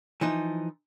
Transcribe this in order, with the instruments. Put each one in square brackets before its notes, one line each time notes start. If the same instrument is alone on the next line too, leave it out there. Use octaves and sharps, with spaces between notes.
[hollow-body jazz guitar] E3 F3 D#4